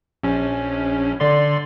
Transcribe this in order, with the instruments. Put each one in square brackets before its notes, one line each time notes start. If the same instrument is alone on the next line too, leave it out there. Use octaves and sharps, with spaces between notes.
[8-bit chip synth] A#1 C#4
D3 D5 C6